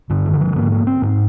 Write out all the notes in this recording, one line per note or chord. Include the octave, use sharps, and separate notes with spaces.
G2 D3
D#3
D3
F3
G#2 A#3
A#3
C4
G#2